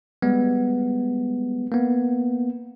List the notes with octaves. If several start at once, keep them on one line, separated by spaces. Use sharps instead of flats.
G3 G#3 B3
A#3 B3